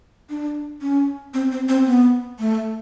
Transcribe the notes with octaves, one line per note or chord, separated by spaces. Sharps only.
D4
C#4
C4
C4
C4
B3
A3